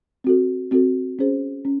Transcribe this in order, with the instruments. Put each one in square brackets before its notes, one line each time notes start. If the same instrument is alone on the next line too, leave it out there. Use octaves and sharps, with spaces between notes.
[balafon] C4 F#4 A4
C4 F#4 A4
C#4 G#4 C5
C#4